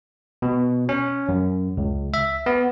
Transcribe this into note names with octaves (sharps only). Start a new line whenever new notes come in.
B2
C#4
F#2
C#2
E5
B3